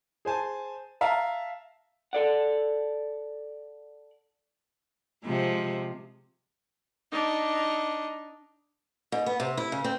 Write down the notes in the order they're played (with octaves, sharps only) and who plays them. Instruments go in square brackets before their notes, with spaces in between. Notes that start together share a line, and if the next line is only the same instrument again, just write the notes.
[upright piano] G#4 C5 G#5 A5
E5 F5 A5 A#5
[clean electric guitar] A4 D5 F#5
[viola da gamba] C3 F3 G#3
[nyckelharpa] D4 D#4
[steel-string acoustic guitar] G#2
B3
C3
E4
C#3
C4